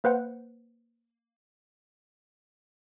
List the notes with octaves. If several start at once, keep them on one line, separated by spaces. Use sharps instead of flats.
A#3 B4 C5 F#5